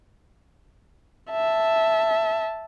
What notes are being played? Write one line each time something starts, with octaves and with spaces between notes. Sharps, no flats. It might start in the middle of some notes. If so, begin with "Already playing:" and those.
E5 A5